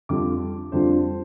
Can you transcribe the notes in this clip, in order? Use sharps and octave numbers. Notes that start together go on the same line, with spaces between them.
F2 D3 G3 D4 F4 D6
F2 D3 G3 D4 F4 C5